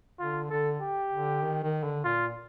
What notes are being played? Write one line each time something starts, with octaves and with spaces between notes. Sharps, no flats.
D3 F4
D3 A4
G4
D3
D#3
D#3
D3
A#2 F4